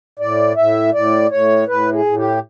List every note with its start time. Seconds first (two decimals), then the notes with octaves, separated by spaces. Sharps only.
0.19 A2 D5
0.57 A2 E5
0.94 A2 D5
1.31 A2 C#5
1.68 A2 B4
1.93 G#4
2.05 A2
2.17 G4